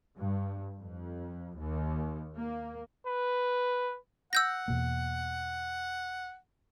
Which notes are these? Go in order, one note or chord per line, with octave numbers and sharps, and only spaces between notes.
G2
F2
D#2
A#3
B4
F#5 E6 G6 A#6
E2 B2 A#3